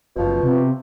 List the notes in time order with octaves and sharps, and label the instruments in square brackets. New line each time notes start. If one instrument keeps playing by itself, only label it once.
[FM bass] F#1 [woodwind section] B2 F3
[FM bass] C3